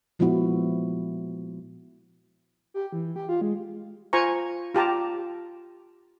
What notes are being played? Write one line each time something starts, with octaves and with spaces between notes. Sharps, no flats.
A#2 F3 G#3 B3 E4 F#4
G4
E3
G4
F4
G#3
F4 C5 G#5 A#5 C#6
F4 G4 A5 A#5